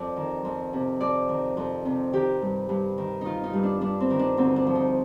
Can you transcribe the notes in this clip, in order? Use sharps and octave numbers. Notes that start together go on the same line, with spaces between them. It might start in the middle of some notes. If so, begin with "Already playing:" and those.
Already playing: F2 D5
D#3
F2
C3
F2 D5
D#3
F2
C3
D#3 G4
G2
G2
D#3
D#3 D#4 F4
D#4
G2
D4
G2 D4
C4
D#3
D4
D2 C4
D4
F3
D#4